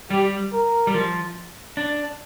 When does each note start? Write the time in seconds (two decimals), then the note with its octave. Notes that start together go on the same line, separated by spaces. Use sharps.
0.11 G3 G4
0.53 A#4
0.87 G3
0.94 F3
1.77 D4